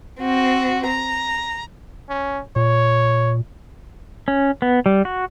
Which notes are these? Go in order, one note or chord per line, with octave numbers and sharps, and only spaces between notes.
C4 F#4
A#5
C#4
A#2 C#5
C#4
B3
G3
F#4